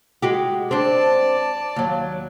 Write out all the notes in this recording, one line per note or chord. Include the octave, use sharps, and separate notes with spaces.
G#3 F#4 G4
C4 D4 D5 A5
D#2 F#3